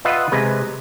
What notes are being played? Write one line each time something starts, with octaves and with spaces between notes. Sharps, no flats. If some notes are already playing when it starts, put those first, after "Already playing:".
F4 B4 D#5 E5 F#5
C3 G#3 B4